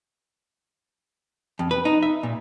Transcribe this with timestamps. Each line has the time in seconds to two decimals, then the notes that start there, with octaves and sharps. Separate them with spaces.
1.59 F2
1.71 B4
1.85 D#4
2.03 E5
2.23 A#2